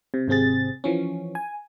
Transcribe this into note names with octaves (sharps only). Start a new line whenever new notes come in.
C3
G#1 C3 C4 G#4 A6
E3 F3 C#4
G#5